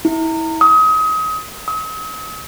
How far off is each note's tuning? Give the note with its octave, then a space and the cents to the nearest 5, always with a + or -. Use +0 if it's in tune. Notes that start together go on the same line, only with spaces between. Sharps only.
E4 -25
D#6 +30
D#6 +45